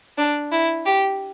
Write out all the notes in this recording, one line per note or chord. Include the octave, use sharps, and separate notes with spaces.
D4
E4
G4